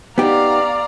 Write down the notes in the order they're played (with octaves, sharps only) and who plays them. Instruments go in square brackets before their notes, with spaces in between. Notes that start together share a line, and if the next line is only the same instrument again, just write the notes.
[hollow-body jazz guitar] B3 D#4 G4 [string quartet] D5 F5 A#5